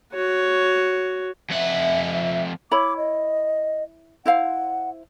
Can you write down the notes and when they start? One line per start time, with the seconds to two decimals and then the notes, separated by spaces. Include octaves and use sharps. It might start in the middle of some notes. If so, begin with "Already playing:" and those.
0.15 F#4 C#5
1.50 F2 E5 F#5
2.71 E4 C#5 B5 D6
2.97 D#5
4.26 E4 C5 F5 F#5